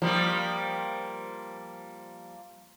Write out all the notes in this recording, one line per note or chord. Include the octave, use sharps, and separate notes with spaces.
F3 G3 A#3